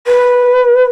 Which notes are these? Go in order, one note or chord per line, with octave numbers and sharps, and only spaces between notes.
B4